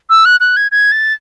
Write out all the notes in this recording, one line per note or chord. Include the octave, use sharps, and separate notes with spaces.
E6
F#6
F#6
G#6
G#6
A6